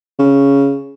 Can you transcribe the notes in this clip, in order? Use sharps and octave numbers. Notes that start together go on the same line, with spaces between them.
C#3